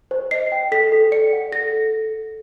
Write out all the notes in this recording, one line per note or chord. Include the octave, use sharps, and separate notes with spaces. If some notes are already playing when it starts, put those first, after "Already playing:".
C5
D#5 C7
G5
A4 B6
A4
D5 C#7
F#5
A4 A#6
A4